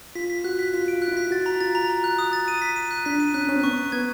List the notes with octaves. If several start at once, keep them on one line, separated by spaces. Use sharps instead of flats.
F4 B6
B6
F#4 F#6
B6
F4 B6
F4 D7
F#6
E4
F4 B6
F#4 A6
A#5
F4 A6
A#5
A#5
F#6
D#6
A6
D#7
B6
D#7
F#6
D4 B6
D#7
C#4 F#6
C#4 F#6
C4
B3 C#6
C#6
B3 G#6